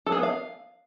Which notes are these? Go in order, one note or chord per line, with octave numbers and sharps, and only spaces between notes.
A4
G#4
B3
F5